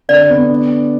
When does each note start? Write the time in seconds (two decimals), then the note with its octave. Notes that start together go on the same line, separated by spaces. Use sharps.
0.09 D3 D5
0.30 B3
0.49 D4